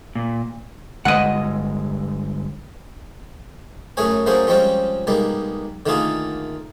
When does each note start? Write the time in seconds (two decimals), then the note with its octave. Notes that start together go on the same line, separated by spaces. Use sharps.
0.15 A#2
1.05 G1 G#3 D#5 F#5
3.97 F#2 A2 A3 G#4 C#5 G#5
4.26 F#3 A3 A#3 C#4 G#4 C5
4.47 F3 G3 G#3 C4 C#4 F4
5.07 B1 G3 G#3 A#3
5.86 D3 D#3 A3 A#3 F4 G#4